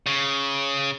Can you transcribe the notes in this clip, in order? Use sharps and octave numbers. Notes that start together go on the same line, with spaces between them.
C#3